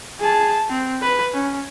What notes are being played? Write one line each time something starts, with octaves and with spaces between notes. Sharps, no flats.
G#4 A5
C4
B4
C#4